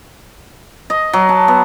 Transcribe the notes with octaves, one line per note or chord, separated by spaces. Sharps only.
D#5
F#3
A5
B3